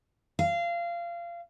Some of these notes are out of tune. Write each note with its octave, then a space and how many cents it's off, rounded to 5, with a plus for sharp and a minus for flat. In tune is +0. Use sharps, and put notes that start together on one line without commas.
F5 -25